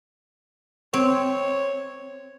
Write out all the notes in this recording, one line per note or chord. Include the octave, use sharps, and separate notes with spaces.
C4 C#5